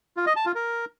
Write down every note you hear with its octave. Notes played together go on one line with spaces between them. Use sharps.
F4
D#5
A5
F4
A#4